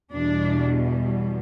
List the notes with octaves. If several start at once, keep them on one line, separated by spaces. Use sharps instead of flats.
E2 B2 G3 D4